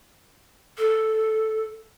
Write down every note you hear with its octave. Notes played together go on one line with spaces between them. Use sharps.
A4